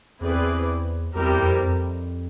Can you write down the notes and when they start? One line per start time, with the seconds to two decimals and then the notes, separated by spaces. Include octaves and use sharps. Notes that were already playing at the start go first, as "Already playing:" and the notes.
0.20 E2 C4 E4 G#4 B4 D5
1.15 E2 G3 C4 E4 G4 A#4
1.38 F2
1.62 F2